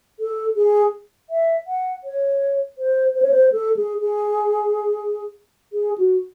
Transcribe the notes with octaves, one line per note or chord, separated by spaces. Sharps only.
A4
G#4
E5
F#5
C#5
C5
C5
C#5
C5
A4
G#4
G#4
G#4
F#4